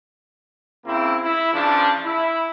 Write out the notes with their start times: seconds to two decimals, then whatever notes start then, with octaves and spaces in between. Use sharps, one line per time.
0.85 C#3 A#3 C4 E4
1.20 E4
1.52 C#3 E3 F3 D4
2.03 E4